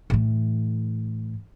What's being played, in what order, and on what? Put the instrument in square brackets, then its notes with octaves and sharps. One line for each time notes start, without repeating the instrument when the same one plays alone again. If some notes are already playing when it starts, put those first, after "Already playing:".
[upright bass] A2 E3